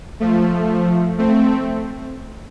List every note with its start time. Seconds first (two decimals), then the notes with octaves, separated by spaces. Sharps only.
0.20 F3 A3
1.18 A3 C4